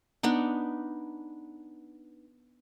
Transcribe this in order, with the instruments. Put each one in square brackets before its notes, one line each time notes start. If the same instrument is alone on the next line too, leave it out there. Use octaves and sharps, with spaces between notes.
[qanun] B3 D4 D#4